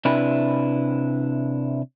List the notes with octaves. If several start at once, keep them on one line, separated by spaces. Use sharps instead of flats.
C3 D4 E4 B4